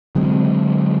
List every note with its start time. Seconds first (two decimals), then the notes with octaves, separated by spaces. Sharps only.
0.15 D3 F#3 G#3 C4